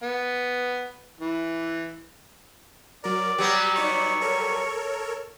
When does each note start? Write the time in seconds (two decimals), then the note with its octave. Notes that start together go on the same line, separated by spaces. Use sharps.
0.03 B3
1.21 E3
3.04 F#3 A#4 D5
3.38 F#3 G3 B3 G4
3.76 D#4 C#5 D5 C#6
4.21 A4 A#4 C#5